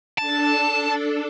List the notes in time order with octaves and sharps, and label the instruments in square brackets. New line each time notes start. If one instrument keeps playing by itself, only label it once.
[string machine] D4 A4 [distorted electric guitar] A5